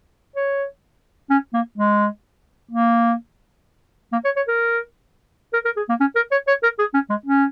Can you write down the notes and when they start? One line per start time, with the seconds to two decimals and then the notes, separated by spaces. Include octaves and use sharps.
0.36 C#5
1.30 C#4
1.54 A#3
1.78 G#3
2.71 A#3
4.12 A#3
4.25 C#5
4.36 C#5
4.48 A#4
5.53 A#4
5.65 A#4
5.77 G#4
5.89 A#3
6.00 C#4
6.16 A#4
6.31 C#5
6.48 C#5
6.63 A#4
6.79 G#4
6.94 C#4
7.10 G#3
7.26 C#4